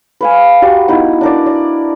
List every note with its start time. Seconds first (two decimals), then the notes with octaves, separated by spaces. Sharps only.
0.21 B4 F5 G#5
0.62 F#4 G4 A#5 C6
0.88 B3 D#4 E4 F#4
1.21 D4 A#4 D5
1.46 D5